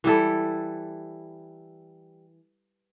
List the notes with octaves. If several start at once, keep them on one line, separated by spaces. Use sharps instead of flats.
E3 G3 E4 A4